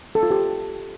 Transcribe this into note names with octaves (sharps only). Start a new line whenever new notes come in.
A4
F4
G4